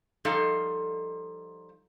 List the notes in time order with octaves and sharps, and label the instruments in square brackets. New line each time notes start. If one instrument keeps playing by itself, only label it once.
[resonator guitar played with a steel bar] F3 G3 D#4 A4 D#5 F5